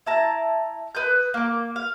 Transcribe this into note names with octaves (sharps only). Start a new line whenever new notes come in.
E4 A5 A#5
B4 D#6 G6
A#3 D6
F5